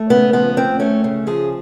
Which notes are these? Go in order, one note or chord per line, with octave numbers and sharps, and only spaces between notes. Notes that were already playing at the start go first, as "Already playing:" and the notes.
Already playing: A3
C#3 B3
F3 B3
D2 C4
A3 C#4
C#3
F3 G#4